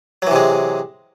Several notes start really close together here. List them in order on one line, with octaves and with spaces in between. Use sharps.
F#3 E3 C3 G#3